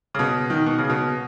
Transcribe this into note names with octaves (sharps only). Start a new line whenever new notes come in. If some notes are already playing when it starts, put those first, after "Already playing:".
C#3
B2
D#3
B2
C#3
B2